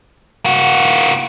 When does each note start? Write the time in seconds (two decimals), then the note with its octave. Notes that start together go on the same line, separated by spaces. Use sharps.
0.45 A#3 F#4